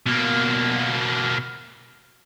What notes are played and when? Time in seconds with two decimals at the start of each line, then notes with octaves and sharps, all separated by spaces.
0.06 B2 A#3